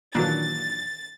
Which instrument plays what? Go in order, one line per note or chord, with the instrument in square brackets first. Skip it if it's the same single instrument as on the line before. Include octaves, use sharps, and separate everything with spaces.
[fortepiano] A#2 E3 F#3 [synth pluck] D#3 A#3 D4 [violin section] A6